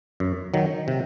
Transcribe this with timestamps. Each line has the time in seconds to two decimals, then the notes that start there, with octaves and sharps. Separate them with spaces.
0.20 F#2
0.54 D#3 F#3
0.88 C3